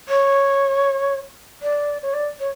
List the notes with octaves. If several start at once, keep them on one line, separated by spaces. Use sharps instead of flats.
C#5
D5
C#5
D5
C#5